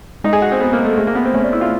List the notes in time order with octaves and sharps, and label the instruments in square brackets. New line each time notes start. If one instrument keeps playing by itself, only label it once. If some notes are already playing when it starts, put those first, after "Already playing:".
[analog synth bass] G#3 [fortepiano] D#4
[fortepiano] G#4
F#4
C4
B3
A#3
A3
[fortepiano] G#3 [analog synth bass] A3
[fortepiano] A#3
B3
C4
[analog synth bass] A3 [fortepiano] C#4
[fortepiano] D4
E4
F4